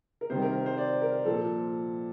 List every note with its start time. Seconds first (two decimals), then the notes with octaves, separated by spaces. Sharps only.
0.21 A#4
0.30 C3 D#3 G3 C5
0.42 A#4
0.66 C5
0.77 D5
1.02 A#4
1.25 A#2 F3 A4